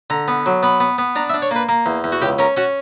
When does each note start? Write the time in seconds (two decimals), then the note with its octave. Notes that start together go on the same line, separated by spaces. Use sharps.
0.10 D3 A#5
0.28 B3
0.46 F#3
0.63 B3 B5
0.80 B3
0.98 B3
1.16 D4 A#5
1.30 E5
1.34 D4
1.42 C#5
1.51 A#3 B4
1.69 A#3 A#4
1.86 E2
2.04 E2
2.12 F#4
2.22 C#2 G4
2.39 C#4 A#4
2.57 C#4 F#4